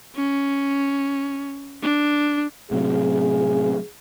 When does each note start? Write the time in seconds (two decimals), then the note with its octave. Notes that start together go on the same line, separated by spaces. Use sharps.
0.15 C#4
1.82 D4
2.71 A2 C3 F#3 G#4